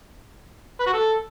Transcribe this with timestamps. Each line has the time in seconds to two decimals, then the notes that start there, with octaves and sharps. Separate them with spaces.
0.79 B4
0.86 F#4
0.93 A4